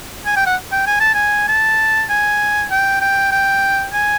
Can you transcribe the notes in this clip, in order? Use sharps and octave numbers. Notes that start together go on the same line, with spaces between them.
G#5
G5
F#5
G5
G#5
A5
G#5
A5
G#5
G5
G5
G5
G#5